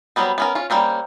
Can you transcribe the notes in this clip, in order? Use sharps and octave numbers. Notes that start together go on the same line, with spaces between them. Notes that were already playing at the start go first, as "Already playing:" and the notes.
F#3 G3 B3 C4
B3 C#4 A#4
C#4 F4
G3 A#3 C4 C#4